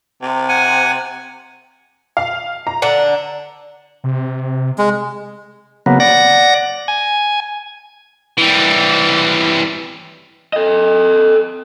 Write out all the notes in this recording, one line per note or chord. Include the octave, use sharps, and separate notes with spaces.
C3
F#5 G#5
F5
A#5
D3 D4 F#5
C3
G#3
C#3 F#3 A#3 B3
D5 F#5 A#6
G#5
E3 G3
A4 D#5